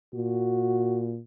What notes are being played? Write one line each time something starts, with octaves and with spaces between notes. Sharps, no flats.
A#2 F#4